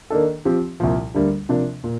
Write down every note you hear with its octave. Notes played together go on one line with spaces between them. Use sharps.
D#3 A#3 D4 A4
F3 C4 G4
C2 A#2 F3
D2 D3 G3 A#3
C3 F3 A#3 D4
A#2